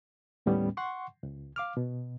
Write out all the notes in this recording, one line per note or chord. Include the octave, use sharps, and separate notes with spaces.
D#2 A2 G3 B3 C#4
F#5 C6 C#6
C#2
F5 D6 F6
B2